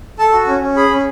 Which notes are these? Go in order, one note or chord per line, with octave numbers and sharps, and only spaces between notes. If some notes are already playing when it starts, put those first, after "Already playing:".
A4 A5
F#4
C#4
C#4
G#4 B5
C#4